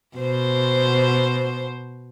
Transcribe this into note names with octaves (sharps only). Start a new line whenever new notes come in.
B2 C5